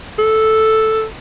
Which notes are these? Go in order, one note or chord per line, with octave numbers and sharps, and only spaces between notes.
A4